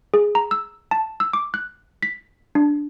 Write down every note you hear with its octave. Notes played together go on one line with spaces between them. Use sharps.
G#4
A#5
E6
A5
E6
D6
F#6
B6
D4